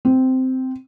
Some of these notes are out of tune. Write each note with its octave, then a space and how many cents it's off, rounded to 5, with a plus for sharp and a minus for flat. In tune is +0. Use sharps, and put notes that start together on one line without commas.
C4 -10